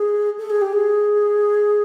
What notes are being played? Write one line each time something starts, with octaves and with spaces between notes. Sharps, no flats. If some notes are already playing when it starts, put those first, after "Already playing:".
Already playing: G#4
A4
G#4
G4
G#4